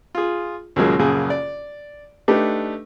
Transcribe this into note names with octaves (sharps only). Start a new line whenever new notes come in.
F4 G#4
D#2 A#2 C#3 F#3 G#3 A#3
A#1 F#2 C#3 G#4
D5
A3 D4 D#4 G4 B4